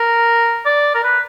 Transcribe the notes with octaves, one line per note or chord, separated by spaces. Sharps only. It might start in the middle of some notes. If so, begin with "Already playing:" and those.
Already playing: A#4
D5
A#4
B4